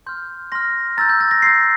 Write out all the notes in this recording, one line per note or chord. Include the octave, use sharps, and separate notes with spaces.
C6 F6 G6
C6 F6 A#6
A#5 E6 G6 A6
G6
A6
A#6
C6 E6 G6 C7